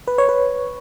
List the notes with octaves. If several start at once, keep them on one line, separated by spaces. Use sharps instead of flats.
B4
C#5
B4